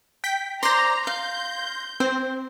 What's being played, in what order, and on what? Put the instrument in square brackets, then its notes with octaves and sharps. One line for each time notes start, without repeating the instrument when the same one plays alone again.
[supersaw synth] G5 B6
[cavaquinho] C5 D5 [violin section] A#5 [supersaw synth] C6 A#6
[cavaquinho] F5 [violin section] G6
[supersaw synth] C4 [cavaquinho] C5